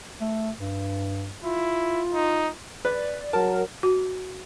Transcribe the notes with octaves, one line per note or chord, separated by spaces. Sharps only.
A3
G2
E4 F4
D#4
B4 D5
F#3 A#4 A5
F#4